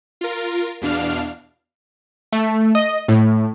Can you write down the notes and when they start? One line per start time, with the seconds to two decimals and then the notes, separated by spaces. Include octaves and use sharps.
0.21 F4 A#4
0.82 E2 B2 D4 F5 F6
2.33 A3
2.75 D#5
3.08 A2